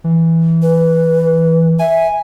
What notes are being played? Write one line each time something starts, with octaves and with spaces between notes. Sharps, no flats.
E3
B4
E5 G#5